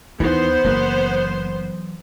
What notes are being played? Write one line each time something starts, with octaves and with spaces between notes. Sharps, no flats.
D#2 E3 B3 C5
F#1 E3 F#3 A#3